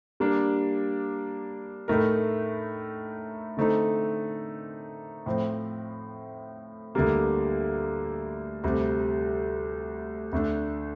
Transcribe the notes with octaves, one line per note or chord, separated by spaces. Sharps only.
G3 A#3 D4
A2 A3 D#4 A#4
D3 A3 C4 D#4
A2 F3 C4
D2 D3 G3 A#3
D2 C3 G3
D2 D3 A3 D4